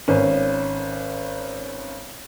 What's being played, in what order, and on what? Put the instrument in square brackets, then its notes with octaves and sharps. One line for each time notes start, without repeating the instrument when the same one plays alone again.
[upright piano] G#1 C#4 B4